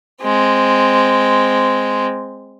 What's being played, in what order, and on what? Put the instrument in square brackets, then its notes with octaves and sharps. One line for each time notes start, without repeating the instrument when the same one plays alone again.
[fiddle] G#3 C4